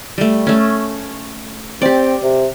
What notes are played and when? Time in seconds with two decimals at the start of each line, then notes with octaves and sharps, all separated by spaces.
0.18 G3 A3
0.47 A3 C#4
1.82 C4 G4 D5
2.23 C3